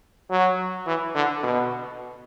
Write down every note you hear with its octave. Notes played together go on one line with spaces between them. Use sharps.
F#3
E3
D3
B2